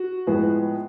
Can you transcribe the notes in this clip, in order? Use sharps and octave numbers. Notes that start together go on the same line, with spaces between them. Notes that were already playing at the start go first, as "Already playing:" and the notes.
Already playing: F#4
A2 F3 G#3 B3